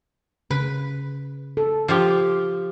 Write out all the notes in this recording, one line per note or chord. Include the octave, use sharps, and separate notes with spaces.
C#3 B4
A4
F3 F4 G4